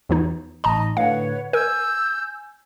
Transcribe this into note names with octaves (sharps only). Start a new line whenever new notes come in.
E2 E3 D#4
A1 D#4 D#5 A5 A#5
A2 D3 B4 C#5 F5 F#5
A#4 G#5 E6 G6